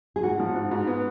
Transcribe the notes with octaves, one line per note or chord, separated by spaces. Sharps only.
G#4
G#2 F#4
F3
G#2
G#2
B3